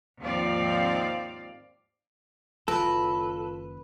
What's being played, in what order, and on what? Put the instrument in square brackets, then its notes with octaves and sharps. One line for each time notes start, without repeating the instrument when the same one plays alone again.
[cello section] D#2 G#2 F3 C4 D5 F5
[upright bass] F#1 D#3 [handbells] F4 [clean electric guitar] A4 [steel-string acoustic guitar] B4